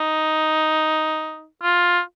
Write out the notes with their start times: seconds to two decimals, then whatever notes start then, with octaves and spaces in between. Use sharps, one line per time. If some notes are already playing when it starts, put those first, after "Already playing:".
Already playing: D#4
1.63 F4